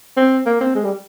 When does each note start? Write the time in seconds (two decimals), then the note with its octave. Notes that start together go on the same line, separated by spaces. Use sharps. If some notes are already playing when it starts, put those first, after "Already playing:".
0.17 C4
0.46 A#3
0.61 C4
0.75 G#3
0.85 G3